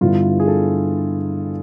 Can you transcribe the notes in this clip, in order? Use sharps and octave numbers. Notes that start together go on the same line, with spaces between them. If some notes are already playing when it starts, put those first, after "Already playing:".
G2 D3 G3 B3 E4 F4
G#4
A4